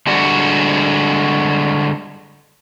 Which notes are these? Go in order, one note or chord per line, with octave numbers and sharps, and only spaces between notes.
D3 G3 G#3 F#4